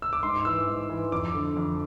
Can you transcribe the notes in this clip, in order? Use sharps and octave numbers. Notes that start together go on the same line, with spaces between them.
E6
D6
G#2 C6
E3 E6
G#2
E3
F2 D6
D3
F2